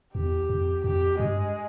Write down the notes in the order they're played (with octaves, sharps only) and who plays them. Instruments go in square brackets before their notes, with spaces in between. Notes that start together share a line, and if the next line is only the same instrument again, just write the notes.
[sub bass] E2 [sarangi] G4
[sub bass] F2
[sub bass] F2 [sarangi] G4
[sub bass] G2 [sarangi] G#3